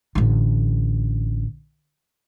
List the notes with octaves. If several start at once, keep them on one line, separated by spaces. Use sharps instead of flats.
A1 D3